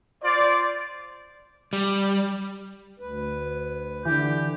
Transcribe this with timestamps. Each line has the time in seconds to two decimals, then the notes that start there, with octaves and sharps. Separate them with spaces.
0.23 F4 C5 D5
1.73 G3
3.00 D2 B4
4.05 D3 E3 G4